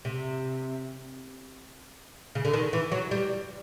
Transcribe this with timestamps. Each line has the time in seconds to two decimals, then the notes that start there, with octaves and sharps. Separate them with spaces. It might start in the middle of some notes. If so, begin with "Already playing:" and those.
0.05 C3
2.35 C#3
2.45 D3
2.53 D#3
2.73 E3
2.92 F#3
3.11 G3